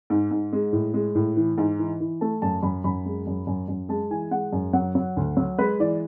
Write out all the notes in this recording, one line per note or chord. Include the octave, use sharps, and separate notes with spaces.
G#2
G#2
G#3
A2
G#3
A2
E3
G#2
E3
E3
A3 A5
F#2 A5
F#2 B5
F#2 B5
G#3
F#2
F#2
F#2
G#3 A5
E3 G#5
G#3 F#5
F#2
F#3 F#5
F#3
D2
F#3
G#3 B4
E3 D5